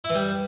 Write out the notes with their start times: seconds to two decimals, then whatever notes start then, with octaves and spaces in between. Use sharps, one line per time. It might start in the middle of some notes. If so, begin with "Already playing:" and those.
0.04 E4
0.10 E3
0.15 G3